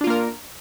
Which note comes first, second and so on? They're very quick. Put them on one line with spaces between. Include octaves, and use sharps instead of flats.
D4 F4 A#3 A#4